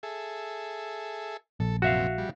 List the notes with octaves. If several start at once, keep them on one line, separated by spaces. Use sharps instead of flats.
G#4 A4 E5
A#1 A4
F#2 C3 F#4 E5 F5
G3